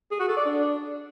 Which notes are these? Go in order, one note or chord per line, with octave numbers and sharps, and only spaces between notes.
G#4
F#4
A4
D5
D4